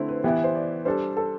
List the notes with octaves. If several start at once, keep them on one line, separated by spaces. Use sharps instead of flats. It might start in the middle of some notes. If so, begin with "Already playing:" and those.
Already playing: D3 A3 C4 E4 C5
B4
E3 B3 E4 G4
C5
D5
G3 D4 A4 C5
A4